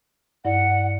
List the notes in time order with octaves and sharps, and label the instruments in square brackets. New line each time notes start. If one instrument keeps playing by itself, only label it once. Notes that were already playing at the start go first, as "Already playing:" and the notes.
[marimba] G2 E4 D5 [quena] F#5